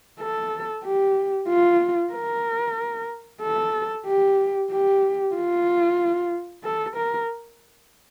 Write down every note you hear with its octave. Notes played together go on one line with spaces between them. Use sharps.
A4
G4
F4
A#4
A4
G4
G4
F4
A4
A#4